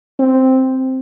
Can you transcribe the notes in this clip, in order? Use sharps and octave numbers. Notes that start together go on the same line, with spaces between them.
C4